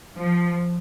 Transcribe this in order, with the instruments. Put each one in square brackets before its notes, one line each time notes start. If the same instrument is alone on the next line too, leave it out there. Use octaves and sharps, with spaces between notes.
[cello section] F3